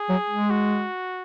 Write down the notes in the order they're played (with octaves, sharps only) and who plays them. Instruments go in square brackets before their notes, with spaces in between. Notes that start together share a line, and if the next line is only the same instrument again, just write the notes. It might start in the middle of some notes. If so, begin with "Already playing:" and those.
Already playing: [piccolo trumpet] G#4
[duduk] F#3
G#3
[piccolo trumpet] F#4